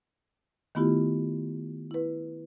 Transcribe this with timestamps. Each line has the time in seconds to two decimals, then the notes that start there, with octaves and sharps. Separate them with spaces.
0.75 D#3 A3 B3 E4 F4 G4
1.91 E4 B4